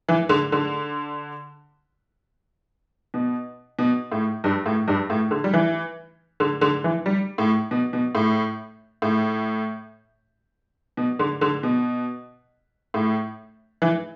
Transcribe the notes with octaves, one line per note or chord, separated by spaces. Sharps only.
E3
D3
D3
B2
B2
A2
G2
A2
G2
A2
D3
G3
E3
D3
D3
E3
G3
A2
B2
B2
A2
A2
B2
D3
D3
B2
A2
E3